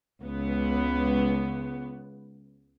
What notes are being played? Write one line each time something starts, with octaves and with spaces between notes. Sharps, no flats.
C#2 B3